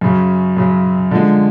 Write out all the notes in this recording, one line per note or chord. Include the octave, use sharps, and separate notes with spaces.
F#2 C#3 F#3
F#2 C#3 F#3
D3 F3 G#3